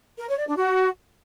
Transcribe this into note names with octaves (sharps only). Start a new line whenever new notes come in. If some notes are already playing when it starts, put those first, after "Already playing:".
A#4
C#5
D5
D4
F#4